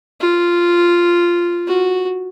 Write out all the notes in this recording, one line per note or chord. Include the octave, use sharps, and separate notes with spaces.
F4
F#4